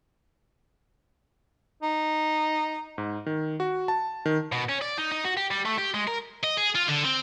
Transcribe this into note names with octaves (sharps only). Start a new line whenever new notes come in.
D#4
G#2
D#3
F#4
A5
D#3
B2
C#4
D5
D#4
D#4
F#4
G4
G3
A3
G4
G#3
A#4
D#5
G#4
F4
D3
C4